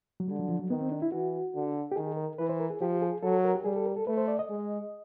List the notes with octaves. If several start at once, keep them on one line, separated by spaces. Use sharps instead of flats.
F#3
D3 G3
F#3
F3
F#3
D#3 B3
C4
D4
E4
E3 F#4
D3
G4
D#3 G#4
A#4
E3 B4
C5
A#4
G#4
F3 G4
G#4
F#3 A4
A#4
G4
G3 G#4
A4
A#4
A4
A3 B4
C5
D5
D#5
G#3